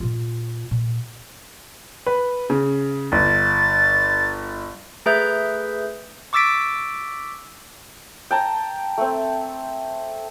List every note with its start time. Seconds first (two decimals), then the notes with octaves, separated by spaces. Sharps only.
0.01 A#2 F4
0.71 A#2
2.06 B4
2.50 C#3
3.12 G1 A6
5.06 A3 G#4 B4 E5 G6
6.33 C#6 D6 E6 A6 B6 D7
8.31 G5 A5 A#5
8.98 A3 C4